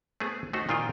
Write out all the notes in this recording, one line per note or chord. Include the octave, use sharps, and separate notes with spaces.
A3 B3 C4 G#4
A3 D#4 F#4 C5
A#2 D#3 C4 F4 D#5 G5